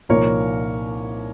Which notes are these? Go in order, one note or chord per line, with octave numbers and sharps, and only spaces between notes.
C2 A#2 F3 A#3 D#4 A#4 C#5